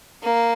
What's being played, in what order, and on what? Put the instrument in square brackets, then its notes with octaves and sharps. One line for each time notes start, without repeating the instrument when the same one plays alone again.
[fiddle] A#3